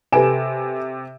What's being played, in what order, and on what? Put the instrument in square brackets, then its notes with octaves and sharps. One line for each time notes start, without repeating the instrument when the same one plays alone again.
[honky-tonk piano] C3 D7 E7 [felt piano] A4 B4 G#5